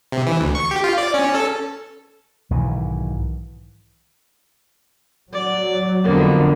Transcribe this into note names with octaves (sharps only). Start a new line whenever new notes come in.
C3
E3
D2
C#6
G4
F4
D5
C#4
A4
B1 G#2 D#3 E3
F#3 D5
F2 D3 A#3 B3